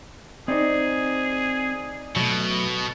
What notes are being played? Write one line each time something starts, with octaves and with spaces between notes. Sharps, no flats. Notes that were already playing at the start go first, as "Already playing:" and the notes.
C4 D#4 G#4 C5 D5
B2 F#3 A3